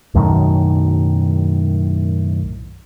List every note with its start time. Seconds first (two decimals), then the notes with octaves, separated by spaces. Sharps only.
0.14 B1 F#2 A2 D#3